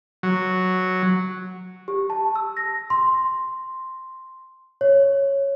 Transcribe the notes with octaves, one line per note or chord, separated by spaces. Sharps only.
F#3
G4
A5
E6
A#6
C6
C#5